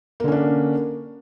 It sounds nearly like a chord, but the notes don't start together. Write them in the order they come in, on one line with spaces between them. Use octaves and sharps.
A#3 D3 C#4 D4